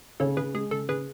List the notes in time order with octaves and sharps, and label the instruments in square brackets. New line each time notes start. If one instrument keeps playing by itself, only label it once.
[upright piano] C#3 [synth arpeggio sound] A4 C#5
[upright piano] C#3 [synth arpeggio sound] G#4 B4
[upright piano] G#3 [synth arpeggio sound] G#4
[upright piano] C#3 [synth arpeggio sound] A4
[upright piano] C#3 [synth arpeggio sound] G#4 B4